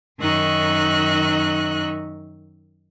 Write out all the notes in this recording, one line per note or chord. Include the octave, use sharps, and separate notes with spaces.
F#2 D#3 D#4 E5 C#6 F#6